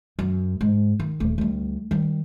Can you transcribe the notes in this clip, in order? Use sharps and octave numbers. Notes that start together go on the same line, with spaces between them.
F#2
G#2
D#3
D#1 A3
D2 G3
D#3 G3